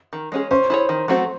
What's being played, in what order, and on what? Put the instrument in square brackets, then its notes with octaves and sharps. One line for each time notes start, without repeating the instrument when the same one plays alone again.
[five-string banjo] D#3
G#3 C#4 G#4
[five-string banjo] C#4 [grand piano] C5
[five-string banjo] E4 G#4 C#5
D#3
F#3 A3 C4 F#4